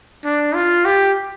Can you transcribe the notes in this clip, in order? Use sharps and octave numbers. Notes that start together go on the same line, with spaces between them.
D4
F4
G4